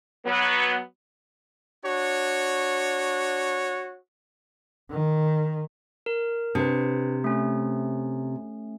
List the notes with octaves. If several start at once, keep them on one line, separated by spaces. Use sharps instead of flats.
F#3 B3
D4 F#4 C#5
D#3
A#4
C3 D4 B4
A3 C#4